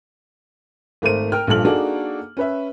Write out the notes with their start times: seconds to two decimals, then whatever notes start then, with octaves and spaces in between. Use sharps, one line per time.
1.02 G#1 A3 A#4 C5 D#7
1.32 A#4 G5 F6
1.47 A#1 G2 A#2 A4 F6 F#7
1.65 A#3 D4 D#4 F#4 G#4 A4
2.37 C#4 B4 E5